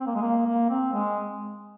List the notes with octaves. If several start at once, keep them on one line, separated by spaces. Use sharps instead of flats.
C4
A#3
G#3
A#3
A#3
C4
G#3